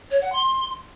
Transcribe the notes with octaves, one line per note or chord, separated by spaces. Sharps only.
C#5
F#5
C6